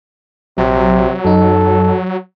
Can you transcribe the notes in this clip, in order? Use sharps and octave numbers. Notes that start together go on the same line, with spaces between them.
A#1 C3 F#3
F#2 D#4 A4